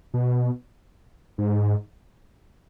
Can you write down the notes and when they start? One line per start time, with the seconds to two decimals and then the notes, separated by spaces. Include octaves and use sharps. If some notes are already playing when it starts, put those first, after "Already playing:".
0.14 B2
1.38 G#2